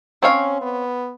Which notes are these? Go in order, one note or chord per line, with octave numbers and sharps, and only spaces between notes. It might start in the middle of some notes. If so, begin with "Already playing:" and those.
C4 C#4 C#5 F5
B3